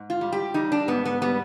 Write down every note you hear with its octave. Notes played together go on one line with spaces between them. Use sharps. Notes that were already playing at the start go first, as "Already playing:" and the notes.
Already playing: G#2
F4
G3
G4
G3 D#4
D4
G#2 B3
B3
G3 B3